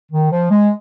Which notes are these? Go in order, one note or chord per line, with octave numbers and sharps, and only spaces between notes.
D#3
F3
G#3